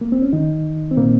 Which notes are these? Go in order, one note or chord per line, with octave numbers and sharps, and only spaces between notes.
A#3
C4
C#4
D#3 D#4
C4
A#2 A#3